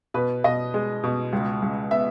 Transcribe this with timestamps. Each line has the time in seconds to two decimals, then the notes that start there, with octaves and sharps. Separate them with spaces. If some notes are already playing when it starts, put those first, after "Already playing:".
0.14 B2 B4
0.44 B2 D#5
0.74 G#3
1.04 B2
1.33 C#2
1.62 C#2
1.91 B3 E5